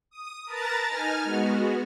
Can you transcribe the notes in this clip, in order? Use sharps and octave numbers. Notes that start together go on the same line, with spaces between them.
D#6
A#4 B4 A5 A#5 A6
D#4 G#5 F6
G#3 B3 F#4